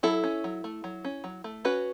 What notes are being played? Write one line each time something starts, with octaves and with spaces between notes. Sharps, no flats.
F#3 E4 A4
C#4
F#3
A3
F#3
C#4
F#3
A3
C#4 F#4 B4